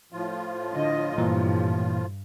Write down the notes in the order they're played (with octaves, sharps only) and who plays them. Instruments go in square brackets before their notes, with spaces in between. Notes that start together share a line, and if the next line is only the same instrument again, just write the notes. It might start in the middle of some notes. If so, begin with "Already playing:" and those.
[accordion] A2 F3 F4
[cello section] D3 D#5
[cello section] G2 [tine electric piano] A#2 E3